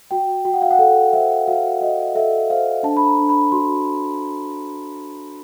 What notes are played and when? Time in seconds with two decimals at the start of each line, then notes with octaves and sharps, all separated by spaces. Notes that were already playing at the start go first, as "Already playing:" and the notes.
0.11 F#4 G5
0.45 F#4 G5
0.53 F#5
0.62 F5
0.71 F#5
0.79 A4 F5
1.13 C5 E5
1.48 F#4 F5
1.81 F#4 D#5
2.15 A4 E5
2.50 C5 F5
2.83 D4 A5
2.97 B5
3.07 A#5
3.18 D4
3.29 B5
3.52 F#4 C6